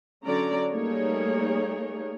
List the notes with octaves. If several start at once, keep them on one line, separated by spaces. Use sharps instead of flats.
D3 F#3 C#4 D5 A#5
G3 A3 A#3 D#4 G#4 C#5